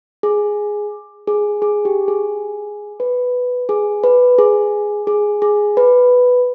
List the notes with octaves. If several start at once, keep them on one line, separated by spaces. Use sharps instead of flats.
G#4
G#4
G#4
G4
G#4
B4
G#4
B4
G#4
G#4
G#4
B4